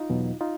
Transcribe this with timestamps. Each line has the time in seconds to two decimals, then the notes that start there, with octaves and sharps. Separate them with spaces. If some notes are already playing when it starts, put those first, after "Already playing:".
Already playing: D#4 F4
0.09 E2 B2 F#3
0.41 D#4 F4